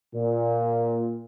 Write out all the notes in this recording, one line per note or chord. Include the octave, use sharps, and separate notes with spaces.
A#2